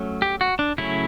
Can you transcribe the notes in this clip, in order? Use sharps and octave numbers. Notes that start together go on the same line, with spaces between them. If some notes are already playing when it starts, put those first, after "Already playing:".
Already playing: F#3 A3 C#4
G4
F#4
D4
C#3 F#3 A3 C#4 E4